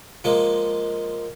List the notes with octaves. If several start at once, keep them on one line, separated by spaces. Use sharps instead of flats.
F3 G#3 A#3